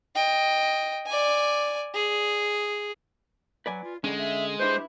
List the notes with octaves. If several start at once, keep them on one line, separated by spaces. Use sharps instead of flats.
D#5 G5
D5 G#5
G#4
F#3 B4 D5 G#5
F4
D3 G3 G#3 C#4
E5
D4 E4 G4 B4 C5